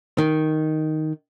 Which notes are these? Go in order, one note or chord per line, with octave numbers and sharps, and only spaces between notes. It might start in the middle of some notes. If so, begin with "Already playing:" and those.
D#3